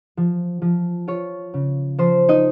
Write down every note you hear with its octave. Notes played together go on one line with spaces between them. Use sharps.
F3
F3
F4 C#5
C#3
F3 C5
D#4 D#5